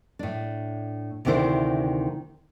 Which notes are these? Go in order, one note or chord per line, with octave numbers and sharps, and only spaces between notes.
A2 D4
D2 C3 D#3 D4 E4 C5